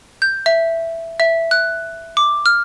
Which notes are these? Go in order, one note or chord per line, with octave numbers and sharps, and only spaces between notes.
G6
E5
E5
F#6
D6
F6